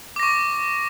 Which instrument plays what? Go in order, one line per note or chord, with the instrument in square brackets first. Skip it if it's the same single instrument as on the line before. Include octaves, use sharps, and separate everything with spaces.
[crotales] D6
A#6
C#6